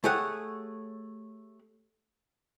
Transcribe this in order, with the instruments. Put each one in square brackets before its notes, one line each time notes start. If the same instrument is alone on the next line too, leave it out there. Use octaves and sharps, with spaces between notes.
[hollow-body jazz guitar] A3 G4 G#4 C#5 F#5